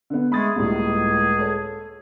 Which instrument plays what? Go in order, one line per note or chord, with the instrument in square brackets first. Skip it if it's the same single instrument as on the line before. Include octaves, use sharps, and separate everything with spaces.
[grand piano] D3 B3
[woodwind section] G#3 A3 G#4 [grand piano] B5 D#6 A6
[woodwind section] C#2 G#4 [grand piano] A2 G3 A#3
[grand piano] A4 C#5